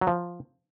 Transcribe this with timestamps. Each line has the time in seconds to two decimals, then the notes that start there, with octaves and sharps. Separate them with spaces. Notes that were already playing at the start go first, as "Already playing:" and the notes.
0.01 F#3
0.07 F3